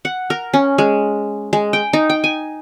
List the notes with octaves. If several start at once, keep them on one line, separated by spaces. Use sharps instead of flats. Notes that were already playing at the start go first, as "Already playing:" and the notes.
F#5
A#4
C#4
G#3
G#3
G5
D#4
G5
G#5